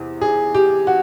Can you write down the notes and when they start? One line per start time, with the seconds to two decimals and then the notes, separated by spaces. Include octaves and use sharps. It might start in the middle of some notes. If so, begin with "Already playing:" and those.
Already playing: E2 C3
0.21 G#4
0.54 G4
0.87 F#4